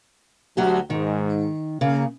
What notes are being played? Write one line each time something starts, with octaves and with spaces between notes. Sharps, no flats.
D2 F#3 F#4 G4
G#2 D#3
C#3 A#3